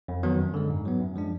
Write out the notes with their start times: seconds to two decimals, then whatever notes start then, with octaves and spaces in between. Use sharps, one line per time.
0.08 F2
0.23 D#3 F#3 B3
0.39 F#2
0.54 D3 G#3
0.70 G#2
0.85 F#3 B3
1.01 F#2
1.16 F3 G#3 D4